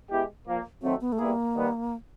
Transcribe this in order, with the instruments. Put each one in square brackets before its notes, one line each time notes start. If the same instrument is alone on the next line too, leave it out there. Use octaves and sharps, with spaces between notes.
[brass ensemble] G#3 B3 E4 G4
A#2 F3 A#3
[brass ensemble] D#3 F#3 A3 [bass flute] C4
[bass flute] B3
A3
[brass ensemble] G3 B3 E4 G#4 [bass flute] A#3
[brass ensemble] D#3 G3 B3